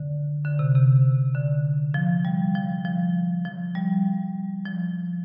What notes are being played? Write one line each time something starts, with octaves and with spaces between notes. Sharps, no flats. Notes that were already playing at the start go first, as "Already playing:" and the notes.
Already playing: D3
D3
C3
C3
D3
F3
G3
F3
F3
F3
G3
F3